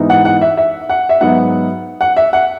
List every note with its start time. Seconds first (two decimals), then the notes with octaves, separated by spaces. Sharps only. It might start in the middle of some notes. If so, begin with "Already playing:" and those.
Already playing: G#2 E3 B3 D#4
0.10 F#5
0.25 F#5
0.41 E5
0.57 E5
0.89 F#5
1.09 E5
1.21 G#2 F#3 B3 D#4 F#5
2.01 F#5
2.16 E5
2.33 F#5